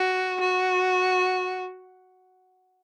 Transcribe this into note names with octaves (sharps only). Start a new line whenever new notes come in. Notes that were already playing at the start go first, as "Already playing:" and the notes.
Already playing: F#4
F#4